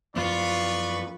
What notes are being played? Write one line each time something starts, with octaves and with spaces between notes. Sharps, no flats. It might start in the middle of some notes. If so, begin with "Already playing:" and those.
F#2 F3 B3 F4 B4 D5 C#6